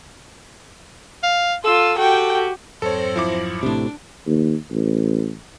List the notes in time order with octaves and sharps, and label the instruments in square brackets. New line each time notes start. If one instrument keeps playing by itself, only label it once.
[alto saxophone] F5
[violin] F4 [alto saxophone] A4 [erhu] E6
[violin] F#4 G4 [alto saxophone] A4 [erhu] G5
[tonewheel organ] F2 G#2 F#3 [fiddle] C4 C5 [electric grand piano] A4 C#5
[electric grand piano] F3 E4 D6
[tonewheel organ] A#1 [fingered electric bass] A2 C3 [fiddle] D4
[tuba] D#2
A1